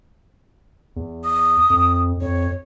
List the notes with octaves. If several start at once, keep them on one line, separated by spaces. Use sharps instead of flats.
E2
D#6
F2
F2 C#5